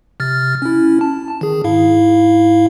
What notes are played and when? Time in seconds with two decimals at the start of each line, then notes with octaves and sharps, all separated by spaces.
0.20 C3 F6 A6
0.62 C#4 E4
1.01 A5
1.41 D#3 G#4
1.64 G#2 E4 F5